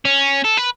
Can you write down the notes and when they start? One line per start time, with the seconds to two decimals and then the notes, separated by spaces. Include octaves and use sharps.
0.05 C#4
0.45 A4
0.58 B4